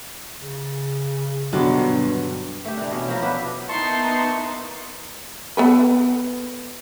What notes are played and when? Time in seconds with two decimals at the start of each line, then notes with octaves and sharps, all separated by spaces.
0.40 C#3
1.53 G2 B2 D3 F#3 G4 B4
2.65 A3 G4
2.77 E3 D4
2.92 B2 C#4
3.09 F3 F#3 B3
3.22 B3 D4 B4 E5
3.69 A#3 B3 D#4 E4 A5 C6 C#6
5.57 B3 A4 B4